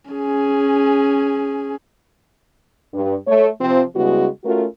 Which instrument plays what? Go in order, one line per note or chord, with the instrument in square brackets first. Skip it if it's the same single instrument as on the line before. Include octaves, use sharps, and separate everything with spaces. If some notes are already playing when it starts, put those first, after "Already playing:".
[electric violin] C#4 G#4
[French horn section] G2
A3 C#5
C3 F3 C4
C#3 G3 G#3 B3 E4 F#4
A3 C#4 F4 F#4 A#4